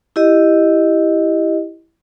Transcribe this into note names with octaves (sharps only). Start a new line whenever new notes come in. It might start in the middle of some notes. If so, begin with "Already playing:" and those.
E4 G4 D#5